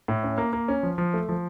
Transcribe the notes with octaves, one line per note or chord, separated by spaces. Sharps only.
A2
C#4
A#3
A#3
C#4
F3
F3
A3
F3